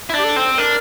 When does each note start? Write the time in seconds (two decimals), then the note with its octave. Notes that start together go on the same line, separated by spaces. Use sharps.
0.10 E4
0.14 D4 G4
0.24 A4
0.36 C4
0.58 D4 A#4